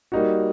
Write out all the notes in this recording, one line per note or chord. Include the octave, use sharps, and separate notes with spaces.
G3 A#3 D#4 F#4